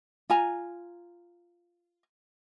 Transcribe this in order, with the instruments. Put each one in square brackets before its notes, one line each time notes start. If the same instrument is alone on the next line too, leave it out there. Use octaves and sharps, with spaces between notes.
[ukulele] F4 G#5 A#5